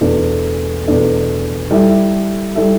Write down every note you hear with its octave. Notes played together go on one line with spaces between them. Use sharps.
E2 B2 A3 D4 A4
E2 B2 A3 D4 A4
G3 E4 A4 E5
G3 E4 A4 E5